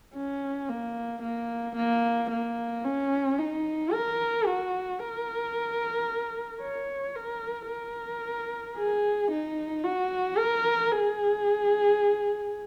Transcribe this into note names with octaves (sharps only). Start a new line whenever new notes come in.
C#4
A#3
A#3
A#3
A#3
C#4
D#4
A#4
F#4
A#4
C#5
A#4
A#4
G#4
D#4
F#4
A#4
G#4